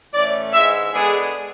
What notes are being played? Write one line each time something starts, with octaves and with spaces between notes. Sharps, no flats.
A2 E3 A3 C#4 D5
G#2 E3 G#3 E5
D3 G#3 B3 D4 G#4